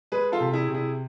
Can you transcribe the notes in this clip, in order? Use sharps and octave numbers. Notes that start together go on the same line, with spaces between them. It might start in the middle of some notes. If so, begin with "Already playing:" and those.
G#3 G#4 B4
F4 A4
C3
E4 G#4
C3
E4 G#4